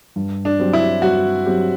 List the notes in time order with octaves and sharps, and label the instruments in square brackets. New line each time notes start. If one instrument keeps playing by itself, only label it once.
[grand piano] G2
[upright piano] D4
[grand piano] F#3 C4 G4
[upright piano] E4
[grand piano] G2 [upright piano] F#4
[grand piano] F#3 C4 G4